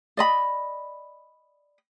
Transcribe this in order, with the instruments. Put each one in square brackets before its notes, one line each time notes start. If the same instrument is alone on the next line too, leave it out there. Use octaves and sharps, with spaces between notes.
[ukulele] D5 D#5 B5